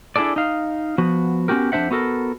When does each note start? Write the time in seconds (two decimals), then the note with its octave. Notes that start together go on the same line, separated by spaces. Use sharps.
0.16 D4 E4 F#4 G#4 A4 D5
0.36 D#4 F5
0.98 F3 B3 F#4
1.48 B3 C#4 F#4 G4 A#4
1.72 F2 A3 D4 C5 E5 F#5
1.91 B3 F#4 A4 A#4